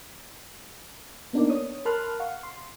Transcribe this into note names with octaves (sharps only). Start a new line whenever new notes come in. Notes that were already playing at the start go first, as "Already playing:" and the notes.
A#3 B3 D4 D#4 A#4 D5
C#5 D#6
A#4 A5 B5 C6 F6 F#6
F5 F#5 C#6
C6